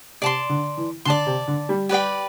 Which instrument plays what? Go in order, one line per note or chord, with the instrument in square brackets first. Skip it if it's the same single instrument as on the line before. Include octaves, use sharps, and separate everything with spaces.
[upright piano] C3 [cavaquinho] D5 A5 C6
[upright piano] D3
E3
[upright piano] D3 [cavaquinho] D5 A5 C6
[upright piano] C3
D3
G3
[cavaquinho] G4 B4 D5 G5